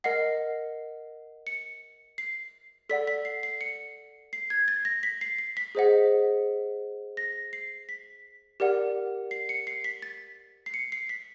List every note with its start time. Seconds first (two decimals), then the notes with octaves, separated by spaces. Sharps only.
0.04 A#4 D#5 F#5 C7
1.47 C#7
2.18 C7
2.89 A4 D5 F#5 B6
3.07 B6
3.25 C7
3.43 C7
3.61 C#7
4.33 C7
4.50 G#6
4.68 A6
4.85 A#6
5.03 B6
5.21 C7
5.39 C7
5.57 B6
5.75 G#4 C5 D#5 F#5
7.17 A#6
7.53 C7
7.89 B6
8.60 G4 A#4 D5 F#5
9.31 C7
9.49 C#7
9.67 C7
9.84 B6
10.02 A6
10.66 C7
10.74 C#7
10.92 C7
11.09 B6